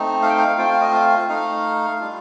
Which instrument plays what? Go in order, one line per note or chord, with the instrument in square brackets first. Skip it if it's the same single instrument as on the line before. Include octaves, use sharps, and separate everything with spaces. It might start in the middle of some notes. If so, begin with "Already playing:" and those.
Already playing: [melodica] A3 C4 D#4
F5
G5
F5
A3 C4 F4 G5
F5
D#5
F5
A3 D#4 F5
G3 D4 F4